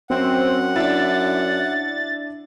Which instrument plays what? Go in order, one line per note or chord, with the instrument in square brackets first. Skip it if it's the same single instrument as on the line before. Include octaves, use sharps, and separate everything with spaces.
[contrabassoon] F#2 [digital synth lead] C4 [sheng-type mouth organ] F#5
[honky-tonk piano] D4 E4 [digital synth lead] A6